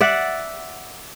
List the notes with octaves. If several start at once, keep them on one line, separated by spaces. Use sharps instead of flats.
D5 E5 F#5